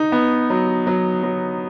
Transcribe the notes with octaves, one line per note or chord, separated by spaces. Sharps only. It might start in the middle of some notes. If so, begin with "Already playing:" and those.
Already playing: D#4
B3
F#3
F#3
F#3